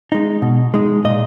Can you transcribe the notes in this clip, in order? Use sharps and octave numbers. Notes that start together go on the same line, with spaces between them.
G#3 D#4
B2
G#3 D#4
A#2 D#5